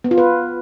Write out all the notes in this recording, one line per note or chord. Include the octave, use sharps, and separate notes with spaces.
B3
F4
B4